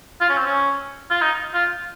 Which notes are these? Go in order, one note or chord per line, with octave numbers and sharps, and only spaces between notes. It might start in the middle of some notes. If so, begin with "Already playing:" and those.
F4
C#4
C4
C#4
F4
D#4
F4